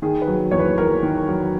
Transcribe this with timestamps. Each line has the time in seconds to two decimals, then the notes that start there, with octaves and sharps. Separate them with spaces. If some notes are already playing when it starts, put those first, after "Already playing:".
0.02 D#3 G#4
0.22 B4
0.28 F#3
0.51 E2 C#5
0.59 B4
0.78 E2 A#4
1.03 D#3
1.28 F#3